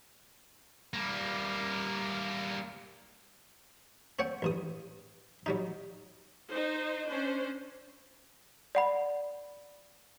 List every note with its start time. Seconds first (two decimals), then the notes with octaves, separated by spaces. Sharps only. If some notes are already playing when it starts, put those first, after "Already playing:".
0.94 G3 A#3
4.19 C4 C#5 F#5 G5
4.42 A1 G2 D#6
5.46 F#3 G3 D#4
6.50 D#4 C5
7.08 C#4 D4 C5
8.75 D5 F#5 B5